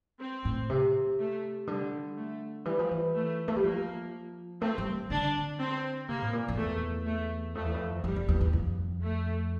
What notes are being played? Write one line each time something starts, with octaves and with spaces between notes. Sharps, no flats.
C4
A2
C3
A3
D3 G3
A3
E3 G3
F3
E3
A3
A3
G3
F3 A#3
A3 C4
G3
D3 D4
C4
C3 A#3
A2
A#2
F2
E2 A3
A3
F2 A3
E2
F2
F2 G3
F2
E2
E2
F2
A3